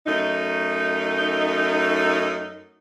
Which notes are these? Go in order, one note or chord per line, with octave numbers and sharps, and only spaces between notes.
F#2 A3 D#4